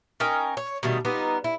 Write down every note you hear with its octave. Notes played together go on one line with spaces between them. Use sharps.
C#4 D#4 A#4 G5
C#5
B2 D#3 G3 A3
G3 B3 D#4 F4
E4